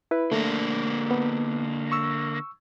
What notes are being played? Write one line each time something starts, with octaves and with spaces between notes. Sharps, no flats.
E4 B4
D3 A3 A#3 D4
B3
C#6 E6